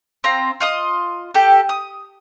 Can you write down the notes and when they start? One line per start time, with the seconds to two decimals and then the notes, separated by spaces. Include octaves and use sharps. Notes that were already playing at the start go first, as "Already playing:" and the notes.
0.24 C4 F4 A#5
0.60 F4 D#5 D#6
1.34 G4 A4
1.69 D#6